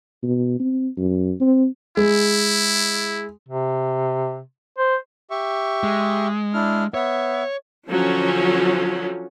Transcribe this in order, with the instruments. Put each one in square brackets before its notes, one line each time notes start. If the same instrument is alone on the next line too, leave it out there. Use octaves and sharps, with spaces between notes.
[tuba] B2
C4
F#2
C4
[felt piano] G#3 [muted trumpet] E4
[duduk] C3
C5
[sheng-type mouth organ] G4 E5 C#6
[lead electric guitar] G#3
[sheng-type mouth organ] D4 E4 F6
[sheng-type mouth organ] B3 E5 [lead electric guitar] C#5
[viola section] D3 F3 F#3 C#4